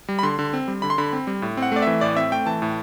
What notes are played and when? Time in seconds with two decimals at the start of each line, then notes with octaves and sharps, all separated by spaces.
0.08 G3
0.19 B5
0.23 D3 C6
0.39 D3
0.53 C4
0.68 G3
0.82 D3 B5
0.90 C6
0.98 D3 B5
1.13 C4
1.27 G3
1.42 A2
1.57 C4
1.62 F#5
1.72 A3 D5
1.82 E3 E5
2.01 A2 D5
2.16 C4 E5
2.32 A3 G5
2.46 E3 A5
2.62 A2